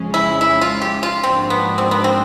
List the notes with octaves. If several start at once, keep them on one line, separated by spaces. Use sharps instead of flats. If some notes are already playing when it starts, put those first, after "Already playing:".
Already playing: F2 C#3 F3 G#3 C#4
E4
E4
F4
G4
F4
G#2 F3 A#3 C4 D4 F#4
B3
C4
B3
C4